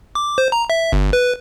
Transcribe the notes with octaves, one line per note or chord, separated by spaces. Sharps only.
D6
C5
A#5
E5
G1
B4